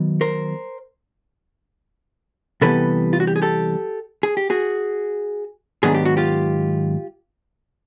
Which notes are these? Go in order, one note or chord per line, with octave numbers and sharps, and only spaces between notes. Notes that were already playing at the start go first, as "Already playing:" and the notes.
Already playing: D#3 F#3 B3
A#4 C5
C3 E3 G3 B3 A4 B4
F4
F#4
G4
G#4
G4 A4
G#4
G4
F#4 G#4
G#2 D#3 F#3 B3 D4 G#4
G4
F#4
F4 G4